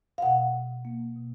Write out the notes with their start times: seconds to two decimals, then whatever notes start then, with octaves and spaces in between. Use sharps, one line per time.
0.18 F5
0.22 B2 F#5
0.53 B2
0.85 A#3
1.16 B2